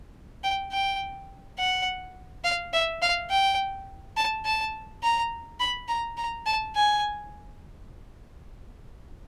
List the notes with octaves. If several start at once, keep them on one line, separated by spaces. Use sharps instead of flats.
G5
G5
F#5
F5
E5
F5
G5
A5
A5
A#5
B5
A#5
A#5
A5
G#5